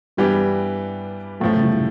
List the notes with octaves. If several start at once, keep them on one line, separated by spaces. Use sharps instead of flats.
G2 E3 G3 B3 D4 G4
F#2 A2 F3 A3
C#3
C2 C3
C3